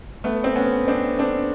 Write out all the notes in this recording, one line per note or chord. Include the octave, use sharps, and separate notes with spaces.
A3 B3
C4
B3 C#4
C4 D4
C4 D4